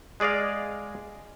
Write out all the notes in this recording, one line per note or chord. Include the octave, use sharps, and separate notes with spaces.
G#3 G#4 D5 D#5 F5